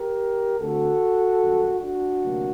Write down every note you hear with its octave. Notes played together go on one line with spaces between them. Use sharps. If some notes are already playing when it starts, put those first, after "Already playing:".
Already playing: G4 A#4
D2 D3 A3 C4 F#4 A4
F#2 D#3 G3
D4 F#4
D2 C3 F#3 A#3